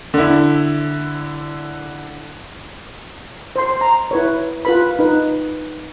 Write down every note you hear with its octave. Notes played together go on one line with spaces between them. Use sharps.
D3 E4
C5 C6
A#5
E4 B4 C#5
F4 B4 B5
D#4 B4